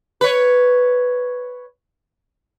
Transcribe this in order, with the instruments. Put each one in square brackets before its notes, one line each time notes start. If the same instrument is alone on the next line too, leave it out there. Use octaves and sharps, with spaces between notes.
[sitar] B4 C#5